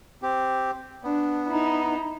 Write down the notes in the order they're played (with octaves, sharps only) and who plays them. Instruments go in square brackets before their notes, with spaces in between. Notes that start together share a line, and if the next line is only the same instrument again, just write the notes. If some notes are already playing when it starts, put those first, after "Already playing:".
[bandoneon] C4 G4
[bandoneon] B3 [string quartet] D4
[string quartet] D#4 E4